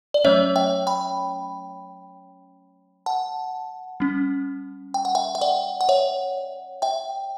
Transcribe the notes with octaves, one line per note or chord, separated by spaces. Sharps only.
D5
F#3 A3 C#4 C#5 E5
E5 G5
G5 B5
F#5 A5
G3 C#4
G5
F#5
E5 G5
E5
D5 F#5
F#5
C#5 E5
E5 G5